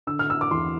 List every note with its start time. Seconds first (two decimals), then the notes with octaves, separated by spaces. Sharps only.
0.07 D3 E6
0.19 F6
0.30 E6
0.41 D6
0.51 E2 C6